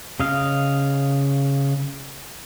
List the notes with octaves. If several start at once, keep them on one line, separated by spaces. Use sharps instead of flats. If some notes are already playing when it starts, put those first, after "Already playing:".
C#3 D#5 F5